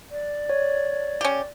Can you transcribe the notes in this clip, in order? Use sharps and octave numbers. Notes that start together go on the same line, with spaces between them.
D5
C#5
C#4 G4